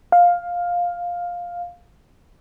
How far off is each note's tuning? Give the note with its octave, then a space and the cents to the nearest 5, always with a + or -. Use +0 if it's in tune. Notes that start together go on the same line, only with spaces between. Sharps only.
F5 +10